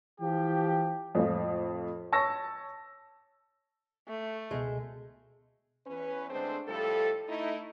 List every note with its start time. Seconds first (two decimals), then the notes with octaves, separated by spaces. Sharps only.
0.20 E3 F3 G4
1.15 F2 A2 F3
2.12 C#5 A5 C#6 E6 A#6
4.08 A3
4.51 C#2 B2 G#3
5.86 E2 C#4 B4
6.30 D3 G#3 A3 C4 D4 C5
6.68 A2 F3 G3 A4
7.29 A3 D#4 E4